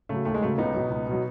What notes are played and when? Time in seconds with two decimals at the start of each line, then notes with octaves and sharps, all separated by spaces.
0.09 C#3 F#3 A3
0.25 D#2 A3
0.34 G#3
0.41 C#3 F#3 A3
0.58 C#2 B3 D#4
0.74 B2 F#3
0.90 C#2
1.07 B2 F#3